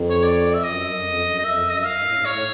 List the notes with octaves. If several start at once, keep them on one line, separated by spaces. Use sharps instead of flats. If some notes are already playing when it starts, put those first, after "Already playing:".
Already playing: F2
C#5
D5
E5
F#2 D#5
F#2
F2
F#2
D#5
F2 E5
F#2 D#5
E5
F5
G2
A2
G#2
A2 C#5